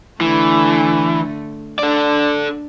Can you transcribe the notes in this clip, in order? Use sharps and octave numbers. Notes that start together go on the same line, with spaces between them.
D3 E3 A3
D4 A4 D5